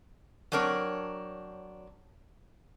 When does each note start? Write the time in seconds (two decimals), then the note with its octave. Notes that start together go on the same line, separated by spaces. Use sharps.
0.52 F#3 C4 D4 A#4 C#5